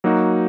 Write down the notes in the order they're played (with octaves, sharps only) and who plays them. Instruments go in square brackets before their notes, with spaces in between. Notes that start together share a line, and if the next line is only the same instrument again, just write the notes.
[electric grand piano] F#3 A#3 D#4 F#4